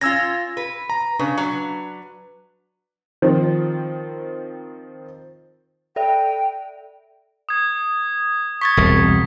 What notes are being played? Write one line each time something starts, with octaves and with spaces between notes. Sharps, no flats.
C#4 F4 E6 G#6 A#6
B4
A#5
C#3 D4 B4
F#3
D#3 F3 C4
A4 D5 E5 G5
D#6 G#6
C#6 G#6 A6 B6
E1 C2